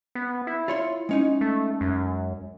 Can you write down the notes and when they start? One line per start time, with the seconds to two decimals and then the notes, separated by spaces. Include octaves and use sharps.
0.15 B3
0.47 E4
0.68 F4 C#5 C6
1.09 G#3 C#4 D#4
1.41 A3
1.81 F#2